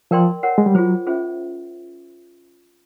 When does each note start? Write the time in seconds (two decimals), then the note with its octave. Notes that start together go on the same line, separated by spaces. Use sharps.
0.11 F3 A#4 D5 G5 C6
0.43 A#4 C#5 F#5
0.58 G#3
0.66 G3
0.75 F#3 F4 G#4 C5
1.06 C#4 F4 G#4 C5 E5